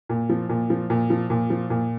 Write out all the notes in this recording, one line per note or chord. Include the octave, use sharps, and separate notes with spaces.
A#2
F3
A#2
F3
A#2
F3
A#2
F3
A#2